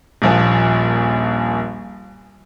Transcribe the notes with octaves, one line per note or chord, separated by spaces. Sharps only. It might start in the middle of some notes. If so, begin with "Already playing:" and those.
D#1 A#1 F3